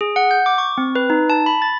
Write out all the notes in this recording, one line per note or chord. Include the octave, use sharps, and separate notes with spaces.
G#4
F#5
G6
D6
C#6
C4
B4
D#4
A5
B5
A6